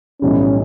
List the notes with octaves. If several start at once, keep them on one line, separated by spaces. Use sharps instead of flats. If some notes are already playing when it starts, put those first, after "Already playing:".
B1 A2 E3 G3 C#4